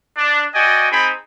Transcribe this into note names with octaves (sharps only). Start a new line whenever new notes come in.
D4
F#4 D5 D#5 G5 G#5
C4 D#4 G#4 G5 B5